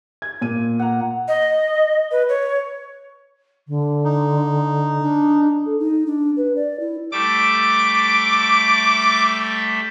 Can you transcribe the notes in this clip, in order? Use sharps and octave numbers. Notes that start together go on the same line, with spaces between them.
G#6
A#2 D#7
F#5 A#5
D#5
B4
C#5
D3
D#4
D4
A4
D#4
D4
B4
D5
E4
G3 A3 E5 D6